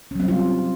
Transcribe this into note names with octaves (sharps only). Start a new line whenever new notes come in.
F#3 G3 C4 C#4 F4